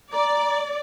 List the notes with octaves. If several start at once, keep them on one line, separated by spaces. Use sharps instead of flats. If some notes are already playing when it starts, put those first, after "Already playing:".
D5 A#5